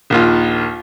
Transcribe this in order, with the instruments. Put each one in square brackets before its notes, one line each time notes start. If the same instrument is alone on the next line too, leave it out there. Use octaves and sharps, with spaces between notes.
[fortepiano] A#1 D#2 F4